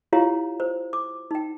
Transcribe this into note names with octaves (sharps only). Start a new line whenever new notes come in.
E4 F4 G4 C#5 F5 A#5
C5
D6
D#4 G5